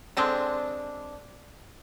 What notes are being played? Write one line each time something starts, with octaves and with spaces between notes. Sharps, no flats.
D3 G#3 C4 D4